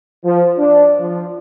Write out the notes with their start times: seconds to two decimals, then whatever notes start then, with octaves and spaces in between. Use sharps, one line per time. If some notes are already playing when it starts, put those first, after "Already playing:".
0.24 F3
0.57 D4
0.99 F3